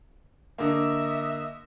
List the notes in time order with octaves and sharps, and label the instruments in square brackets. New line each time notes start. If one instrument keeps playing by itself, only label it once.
[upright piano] D3 A#3 [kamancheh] D#5 E5